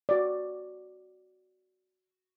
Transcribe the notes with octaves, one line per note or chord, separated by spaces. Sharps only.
F#4 D5